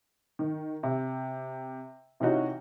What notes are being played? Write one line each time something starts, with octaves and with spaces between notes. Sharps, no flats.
D#3
C3
C3 E3 C#4 D#4 F#4